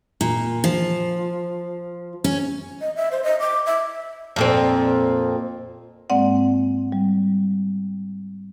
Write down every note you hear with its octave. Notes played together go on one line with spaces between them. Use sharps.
A#2
F3
C#4
D#5
E5
C5
D#5
D6
E5
F2 A#2 C4
G#2 G#3 A#3 C4 D5 F#5
G3